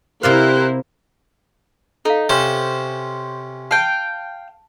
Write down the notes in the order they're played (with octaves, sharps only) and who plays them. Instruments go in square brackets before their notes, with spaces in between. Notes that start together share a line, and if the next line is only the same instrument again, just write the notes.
[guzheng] C3 D5 F5 [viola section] E4 A#4 C5 [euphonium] G4 [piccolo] F#6
[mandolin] D#4 [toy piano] A4 F5
[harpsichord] C3 C#4 [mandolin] C5
[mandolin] F5 G5 [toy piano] A5